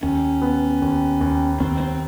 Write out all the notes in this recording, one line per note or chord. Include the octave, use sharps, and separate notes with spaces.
D#2 C#4
B3
D#2
D#2
D#2 C4
C4